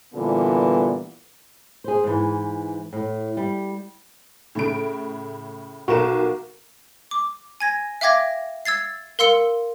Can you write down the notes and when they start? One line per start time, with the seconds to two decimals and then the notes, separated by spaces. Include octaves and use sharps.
0.14 A#2 D3 E3 G3 B3
1.84 G#4 C5
2.04 G#2 E3
2.93 A2
3.37 G3
4.55 A2 C#3 D7
5.88 B1 F#4 A#4 E7
7.11 D6
7.60 G#5 G#6 A#6
8.01 E5 F5 G5 D6 G#6 A#6
8.65 E6 G#6 A6 C7
9.19 A#4 F5 C6 E6 C#7 G7